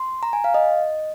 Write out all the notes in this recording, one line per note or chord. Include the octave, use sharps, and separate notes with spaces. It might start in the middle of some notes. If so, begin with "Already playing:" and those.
Already playing: C6
A#5
G#5
F5
D#5